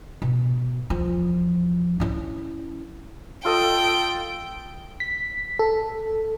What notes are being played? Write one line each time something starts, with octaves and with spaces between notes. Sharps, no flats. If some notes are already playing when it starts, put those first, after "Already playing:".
B2
E2 F3
C#4 E4
F4 A4 D#5 G5
B6
A4